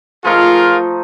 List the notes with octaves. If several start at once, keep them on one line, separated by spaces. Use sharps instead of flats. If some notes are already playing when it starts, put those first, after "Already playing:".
F3 A3 D#4 F4 G#4 A#4